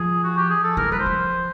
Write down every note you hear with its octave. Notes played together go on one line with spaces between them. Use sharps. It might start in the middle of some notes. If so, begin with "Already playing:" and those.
Already playing: F3 G#4
F#4
G4
G#4
A4
E3 A#4
F#3 B4
C5
F3